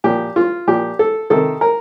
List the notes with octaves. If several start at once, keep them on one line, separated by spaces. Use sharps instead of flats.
A#2 F3 G4
F4
A#2 F3 G4
A4
C3 D#3 A4
A#4